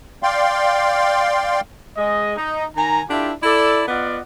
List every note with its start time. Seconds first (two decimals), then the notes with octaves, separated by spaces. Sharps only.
0.23 D5 F5 G5 C6
1.97 G#3 D#5
2.37 D#4
2.75 D#3 G#5 A#5
3.10 D4 E4 F4 G4 A4
3.43 E4 A4 D5
3.88 B3 F4 D5 D#5 F#5